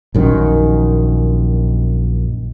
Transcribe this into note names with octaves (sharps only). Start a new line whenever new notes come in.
A#1 F#2 D#3